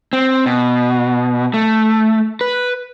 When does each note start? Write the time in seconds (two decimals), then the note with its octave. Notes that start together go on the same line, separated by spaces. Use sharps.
0.13 C4
0.46 B2
1.54 A3
2.41 B4